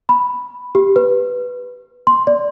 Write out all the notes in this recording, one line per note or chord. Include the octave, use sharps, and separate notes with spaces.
B5
G4
B4
C6
D5